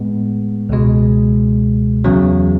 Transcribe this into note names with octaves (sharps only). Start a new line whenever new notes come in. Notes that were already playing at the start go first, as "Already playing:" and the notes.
Already playing: A2 G#3 B3
C#2 B2 G#3
E2 C#3 F#3